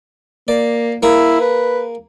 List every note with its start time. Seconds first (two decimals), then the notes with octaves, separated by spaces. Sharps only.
0.48 A#3 D5
1.03 A#3 E4 G#4
1.40 B4